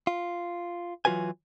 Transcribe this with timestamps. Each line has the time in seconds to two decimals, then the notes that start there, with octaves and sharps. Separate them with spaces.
0.07 F4
1.05 E3 F#3 F4 F#4 B4 G#5